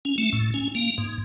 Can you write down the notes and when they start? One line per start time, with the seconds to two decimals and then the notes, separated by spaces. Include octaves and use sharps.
0.05 C#4
0.18 A3
0.33 A2
0.54 C#4
0.75 A#3
0.98 G#2